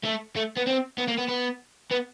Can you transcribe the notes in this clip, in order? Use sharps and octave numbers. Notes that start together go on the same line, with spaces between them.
A3
A3
B3
C4
B3
A#3
B3
B3
B3